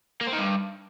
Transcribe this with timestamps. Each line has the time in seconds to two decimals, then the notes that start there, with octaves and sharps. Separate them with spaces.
0.21 A#3
0.27 C4
0.33 D#3
0.39 G2